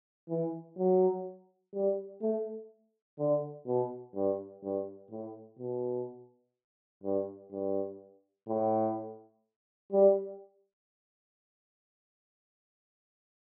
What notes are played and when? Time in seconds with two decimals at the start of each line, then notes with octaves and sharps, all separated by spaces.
0.29 E3
0.78 F#3
1.74 G3
2.22 A3
3.19 D3
3.67 B2
4.15 G2
4.63 G2
5.11 A2
5.59 B2
7.04 G2
7.52 G2
8.48 A2
9.92 G3